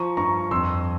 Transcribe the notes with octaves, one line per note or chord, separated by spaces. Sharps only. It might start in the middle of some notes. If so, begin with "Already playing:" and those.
Already playing: F3 A#5 C#6
G2 A#5 C#6
F2 C6 E6